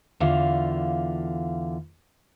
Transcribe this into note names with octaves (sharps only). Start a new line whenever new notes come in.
E2 D3 F4 F5